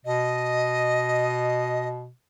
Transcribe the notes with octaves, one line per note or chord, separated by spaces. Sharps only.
B2 D#5